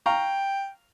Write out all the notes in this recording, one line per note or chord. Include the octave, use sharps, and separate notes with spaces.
F5 G5 A#5 C#6